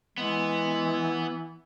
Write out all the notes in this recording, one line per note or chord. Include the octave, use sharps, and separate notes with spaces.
E3 G#3 B3